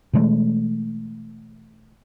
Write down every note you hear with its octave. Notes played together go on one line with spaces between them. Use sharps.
B2 E3 G#3 A3